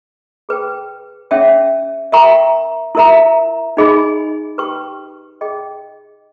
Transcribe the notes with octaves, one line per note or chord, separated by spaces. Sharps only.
G#4 B4 G5
C#4 G#4 C#5 E5 G5
A#4 E5 G5 A#5 C#6
E4 A#4 E5 A#5
D#4 G#4 D#5 G#5 B5
G4 B4 G5 C#6
G#4 D#5 G5